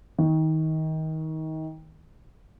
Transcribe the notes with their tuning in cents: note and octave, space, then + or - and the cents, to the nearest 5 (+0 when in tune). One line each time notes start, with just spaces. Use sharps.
D#3 +25